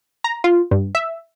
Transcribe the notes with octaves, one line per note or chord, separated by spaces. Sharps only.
A#5
F4
G2
E5